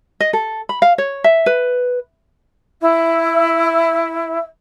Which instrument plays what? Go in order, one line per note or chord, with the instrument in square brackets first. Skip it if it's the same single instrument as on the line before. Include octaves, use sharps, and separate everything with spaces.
[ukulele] D#5
A4
B5
F5
C#5
E5
B4
[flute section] E4 [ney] E5